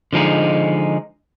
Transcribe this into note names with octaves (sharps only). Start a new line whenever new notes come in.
D3 F3 G#3 D#4